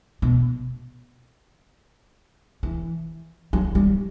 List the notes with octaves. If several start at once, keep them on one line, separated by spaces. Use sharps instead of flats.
B2
E3
F#3
G3